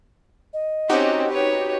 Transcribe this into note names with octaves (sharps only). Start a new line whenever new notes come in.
D#5
C4 C#4 D#4 F#4 G4
B4 C#5